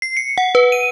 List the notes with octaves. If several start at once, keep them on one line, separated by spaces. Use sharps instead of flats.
C7
C#7
F#5
B4
D#7